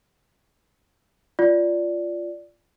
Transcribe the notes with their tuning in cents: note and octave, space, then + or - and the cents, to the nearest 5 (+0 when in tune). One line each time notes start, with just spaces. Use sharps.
F4 -10 D5 -5